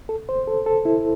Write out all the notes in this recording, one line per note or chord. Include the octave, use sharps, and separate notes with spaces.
A4
C5
A4
A4
E4